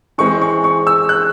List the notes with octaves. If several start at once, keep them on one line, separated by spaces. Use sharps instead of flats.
E3 G#3 C4 C#6
C#6
C#6
E6
F#6